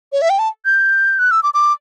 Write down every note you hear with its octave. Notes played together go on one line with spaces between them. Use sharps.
C#5
E5
G5
A5
G6
F#6
E6
D6
D6